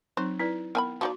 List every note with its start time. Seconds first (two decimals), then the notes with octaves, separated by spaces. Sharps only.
0.17 F#3 C4 D#4 C5
0.39 E4 B4 D5
0.75 D#3 B3 G#5 B5
1.01 F3 D#4 F#4 D5 C6